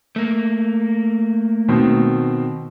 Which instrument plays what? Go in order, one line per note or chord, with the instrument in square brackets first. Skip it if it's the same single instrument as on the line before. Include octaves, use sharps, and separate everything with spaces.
[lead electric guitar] A3 A#3
[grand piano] B2 D#3 C4